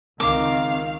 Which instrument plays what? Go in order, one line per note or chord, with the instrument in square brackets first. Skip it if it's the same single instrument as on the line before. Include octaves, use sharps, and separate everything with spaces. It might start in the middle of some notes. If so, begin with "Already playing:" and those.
[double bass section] C#2 D#3 C4 [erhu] F5 [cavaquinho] D6